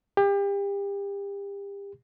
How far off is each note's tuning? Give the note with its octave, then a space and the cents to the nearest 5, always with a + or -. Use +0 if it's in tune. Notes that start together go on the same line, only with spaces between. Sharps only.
G4 +30